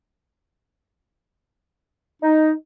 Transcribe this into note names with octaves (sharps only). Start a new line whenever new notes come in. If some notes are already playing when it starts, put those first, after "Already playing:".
D#4